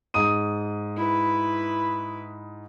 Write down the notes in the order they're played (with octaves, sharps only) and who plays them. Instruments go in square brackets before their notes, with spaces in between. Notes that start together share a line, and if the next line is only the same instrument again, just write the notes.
[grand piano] G#2 D#6 D#7
[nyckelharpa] E4 B4